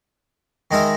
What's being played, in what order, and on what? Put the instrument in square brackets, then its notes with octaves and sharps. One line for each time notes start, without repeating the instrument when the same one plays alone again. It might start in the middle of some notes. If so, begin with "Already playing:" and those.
[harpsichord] D#3 G#3 D#4 A#4 E5